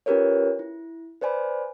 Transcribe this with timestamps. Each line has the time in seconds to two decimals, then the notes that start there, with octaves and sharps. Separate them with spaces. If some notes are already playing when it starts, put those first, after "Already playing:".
0.06 C#4 F4 G4 A#4 B4 C#5
0.59 E4
1.21 B4 C5 D5 G#5 B5